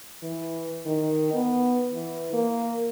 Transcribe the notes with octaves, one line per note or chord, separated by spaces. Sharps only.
E3
D#3
B3
E3
A#3